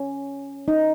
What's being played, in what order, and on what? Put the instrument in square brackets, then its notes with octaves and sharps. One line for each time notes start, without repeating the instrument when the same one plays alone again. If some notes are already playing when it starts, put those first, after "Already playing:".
Already playing: [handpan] C#4
D#4